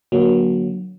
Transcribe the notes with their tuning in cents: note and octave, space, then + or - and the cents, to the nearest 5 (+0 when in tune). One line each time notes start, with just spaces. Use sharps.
D3 +0 F#3 +0 A#3 +30